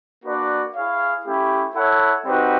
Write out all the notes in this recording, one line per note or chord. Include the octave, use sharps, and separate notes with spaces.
A#3 D4 F#4 B4 D5
E4 G#4 C#5 F5
A3 C#4 E4 G4
E4 A4 C#5 F#5
G3 C4 D#4 F#4 B4